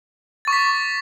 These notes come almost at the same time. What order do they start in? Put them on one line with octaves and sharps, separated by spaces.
A6 C#6 D6 B6